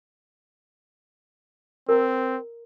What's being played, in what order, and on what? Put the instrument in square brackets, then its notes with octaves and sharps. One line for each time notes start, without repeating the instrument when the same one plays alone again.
[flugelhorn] C4 [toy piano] A#4 A#5